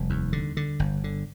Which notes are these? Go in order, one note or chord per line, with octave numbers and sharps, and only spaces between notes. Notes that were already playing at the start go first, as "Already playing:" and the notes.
Already playing: F1 G3
D#2
D3
D3
G1
D3